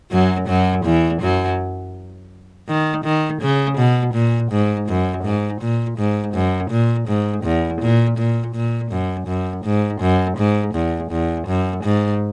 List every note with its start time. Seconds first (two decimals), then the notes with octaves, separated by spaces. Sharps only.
0.11 F#2 F#3
0.48 F#2 F#3
0.84 E2 E3
1.22 F#2 F#3
2.69 D#3
3.05 D#3
3.42 C#3
3.78 B2
4.14 A#2
4.52 G#2
4.89 F#2
5.24 G#2
5.61 A#2
5.99 G#2
6.35 F#2
6.71 A#2
7.08 G#2
7.44 E2
7.82 A#2
8.18 A#2
8.55 A#2
8.91 F#2
9.27 F#2
9.65 G#2
10.02 F#2
10.38 G#2
10.75 E2
11.12 E2
11.48 F#2
11.84 G#2